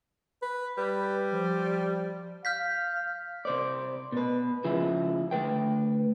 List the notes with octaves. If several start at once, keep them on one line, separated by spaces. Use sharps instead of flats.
B4
G3 B4
F3
F5 F6 G6 B6
C3 C5 D5
B2 B4
C#3 F3 E4 G#4
D2 B4 G5